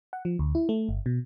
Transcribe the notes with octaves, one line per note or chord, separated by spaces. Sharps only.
F#5
F3
D2
E4
A3
G1
B2